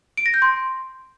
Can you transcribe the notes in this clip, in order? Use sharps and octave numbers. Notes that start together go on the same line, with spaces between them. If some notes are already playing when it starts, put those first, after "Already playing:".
D7
A#6
G6
C6